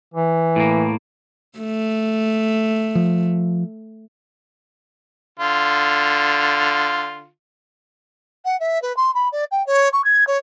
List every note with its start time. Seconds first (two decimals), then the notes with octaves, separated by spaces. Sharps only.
0.14 E3
0.56 A2 A#3
1.59 A3
2.95 F3
5.39 D3 F4
8.45 F#5
8.60 E5
8.82 B4
8.97 C6
9.15 B5
9.32 D5
9.51 G5
9.67 C#5
9.93 C#6
10.04 G#6
10.27 C#5